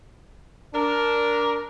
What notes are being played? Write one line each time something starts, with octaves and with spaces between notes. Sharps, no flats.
D4 A#4